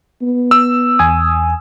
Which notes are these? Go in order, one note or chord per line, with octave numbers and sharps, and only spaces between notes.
B3
E6
E2 G#5 D#6